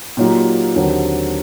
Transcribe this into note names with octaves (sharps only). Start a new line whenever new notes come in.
A#2 F#3 A#3 D#4 G4
D#2 D3 F#3 C4 G4